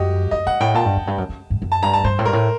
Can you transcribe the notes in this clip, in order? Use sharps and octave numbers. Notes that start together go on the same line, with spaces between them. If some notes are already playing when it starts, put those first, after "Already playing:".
Already playing: F#2 F#4 G4 D#5
F#2 D#5
G2 F#5
A2 G5
A#2 A5
G2
F#2
G2
F#2
F#2
G2
F#2
A5
G2 A#5
A5
G2 C5
A2
G2 A#4
A2